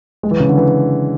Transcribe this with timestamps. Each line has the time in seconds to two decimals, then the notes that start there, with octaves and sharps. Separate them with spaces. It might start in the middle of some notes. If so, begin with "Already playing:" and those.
0.23 G#3
0.31 E3
0.40 C#3
0.49 D3
0.57 E3